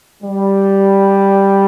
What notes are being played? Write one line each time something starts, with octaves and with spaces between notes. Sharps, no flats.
G3